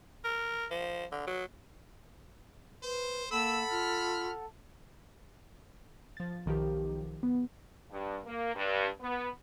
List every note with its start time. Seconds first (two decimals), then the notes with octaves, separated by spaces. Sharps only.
0.24 A#4
0.71 F3
1.12 D3
1.27 F#3
2.83 B4 C5
3.31 A#3 A4 F#5 A5 B5 E6
3.71 F4 F6
6.17 F3 A6
6.46 B1 D#3 F3 G4
7.23 B3
7.91 G2
8.25 A#3
8.55 G2
9.01 B3